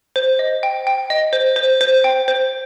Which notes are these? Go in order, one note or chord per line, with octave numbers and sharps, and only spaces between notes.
C5
D#5
G5
G5
D#5
C5
C5
C5
G5
C5